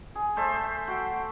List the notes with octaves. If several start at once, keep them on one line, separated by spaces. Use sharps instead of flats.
G#4
A3 C5 E5 A5
F#4 G5